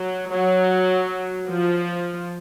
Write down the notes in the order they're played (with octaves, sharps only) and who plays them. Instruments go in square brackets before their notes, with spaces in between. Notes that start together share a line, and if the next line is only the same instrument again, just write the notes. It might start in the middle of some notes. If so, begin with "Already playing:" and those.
Already playing: [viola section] F#3
F#3
F3